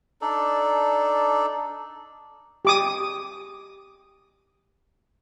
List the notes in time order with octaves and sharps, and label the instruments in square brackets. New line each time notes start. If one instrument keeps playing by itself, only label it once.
[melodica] D4 D#4 A4 D5
[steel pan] G4 D6 D#6